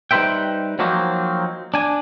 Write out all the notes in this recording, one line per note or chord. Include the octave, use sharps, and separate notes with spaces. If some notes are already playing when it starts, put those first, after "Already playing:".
G3 D#4 B4 C5 E5 G5
F3 F#3 A#3 C4 D#4 F#4
D4 G#5